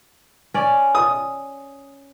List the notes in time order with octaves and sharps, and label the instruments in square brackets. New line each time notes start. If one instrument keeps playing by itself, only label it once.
[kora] C#4 D5
[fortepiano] D#6